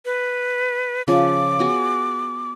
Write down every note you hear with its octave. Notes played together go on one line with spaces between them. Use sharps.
B4
C#3 F3 D6
B3 F#4 G#4